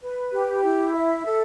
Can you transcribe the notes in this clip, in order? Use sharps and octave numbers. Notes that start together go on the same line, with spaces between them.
B4
G4
E4
E5
A4